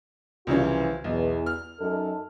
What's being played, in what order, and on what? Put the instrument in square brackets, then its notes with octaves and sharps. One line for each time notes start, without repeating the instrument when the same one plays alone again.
[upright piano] C2 C#3 C#4 [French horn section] E3 F3 F4
[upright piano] B1 [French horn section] E2
[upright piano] F6
[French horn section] F#2 D#4 A4